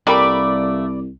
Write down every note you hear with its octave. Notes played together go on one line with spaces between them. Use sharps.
C2 G3 A3 A#3 D5 B5